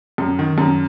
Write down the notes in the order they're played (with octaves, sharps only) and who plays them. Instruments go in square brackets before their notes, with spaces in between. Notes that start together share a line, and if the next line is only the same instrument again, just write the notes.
[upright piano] F#2
D#3
F#2